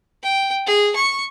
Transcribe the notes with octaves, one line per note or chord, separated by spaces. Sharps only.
G5
G#4
C#6